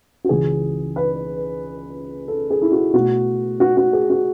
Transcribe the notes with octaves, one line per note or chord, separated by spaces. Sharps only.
F#4
C#2 C#3 E3 G#4
B4
A4
G#4
E4
F#4
B2 A3 F#4
F#4
F#4
G#4
F#4